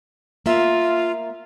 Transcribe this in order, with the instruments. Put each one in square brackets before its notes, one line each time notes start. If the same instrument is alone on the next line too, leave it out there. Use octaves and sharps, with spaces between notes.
[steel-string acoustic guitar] A#3 E5 [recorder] F4